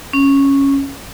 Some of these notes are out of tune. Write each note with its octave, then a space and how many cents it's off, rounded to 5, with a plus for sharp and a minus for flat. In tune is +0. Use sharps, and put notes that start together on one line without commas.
C#4 -5